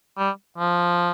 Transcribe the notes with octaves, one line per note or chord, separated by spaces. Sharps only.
G3
F3